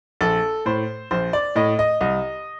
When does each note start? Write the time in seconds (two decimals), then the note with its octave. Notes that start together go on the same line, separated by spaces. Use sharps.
0.21 A#1 A4
0.66 A2 C5
1.11 A#1 C5
1.33 D5
1.56 A2 D#5
1.79 D#5
2.01 C2 D#5